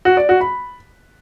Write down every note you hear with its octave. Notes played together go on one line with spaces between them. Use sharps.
F#4
D5
F#4
B5